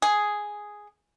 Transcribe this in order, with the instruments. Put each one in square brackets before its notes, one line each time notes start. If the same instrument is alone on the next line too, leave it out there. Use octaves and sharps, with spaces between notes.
[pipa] G#4